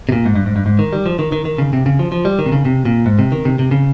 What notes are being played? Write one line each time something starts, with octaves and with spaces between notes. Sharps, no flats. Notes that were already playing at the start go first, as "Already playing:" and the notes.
C3
A#2
G#2
G2
G#2
G2
G#2
D#3
G3
F3
D#3
D#3
D#3
C#3
C3
C#3
F3
F3
G3
D#3
C3
C#3
C3
A#2
G#2
C3
D#3
C3
C3
C#3